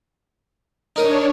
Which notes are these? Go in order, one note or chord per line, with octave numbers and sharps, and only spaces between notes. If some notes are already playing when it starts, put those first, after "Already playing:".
D4 D#4 A#4 C#5 D#6